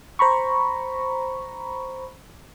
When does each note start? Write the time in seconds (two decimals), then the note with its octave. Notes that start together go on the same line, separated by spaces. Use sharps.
0.19 C5 A#5 B5 C#6